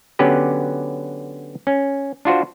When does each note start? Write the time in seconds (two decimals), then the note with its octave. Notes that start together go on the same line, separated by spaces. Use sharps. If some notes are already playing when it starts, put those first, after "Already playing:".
0.19 D3 F#3 B3 C#4 G4 B4
1.67 C#4
2.25 D4 F4 F#4 C5